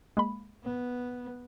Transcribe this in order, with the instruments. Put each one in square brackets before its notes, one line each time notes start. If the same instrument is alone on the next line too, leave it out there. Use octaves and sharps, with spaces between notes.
[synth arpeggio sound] G#3 A#3 B5
[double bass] B3